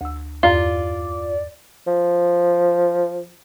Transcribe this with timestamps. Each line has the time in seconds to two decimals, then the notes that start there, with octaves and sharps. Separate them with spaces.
0.01 D2 E6
0.43 E2 G2 F4 D5 A#5
1.87 F3